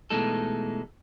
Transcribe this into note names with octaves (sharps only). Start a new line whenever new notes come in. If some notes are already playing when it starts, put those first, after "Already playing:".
B2 E3 G#3 A3 D#4 A4